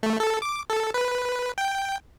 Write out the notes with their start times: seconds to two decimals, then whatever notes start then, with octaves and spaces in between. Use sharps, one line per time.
0.03 A3
0.20 A4
0.42 D6
0.70 A4
0.94 B4
1.58 G5